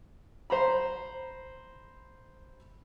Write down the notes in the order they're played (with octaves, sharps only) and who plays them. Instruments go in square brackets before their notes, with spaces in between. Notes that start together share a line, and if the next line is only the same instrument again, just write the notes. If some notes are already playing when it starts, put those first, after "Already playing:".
[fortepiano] C5 A#5 B5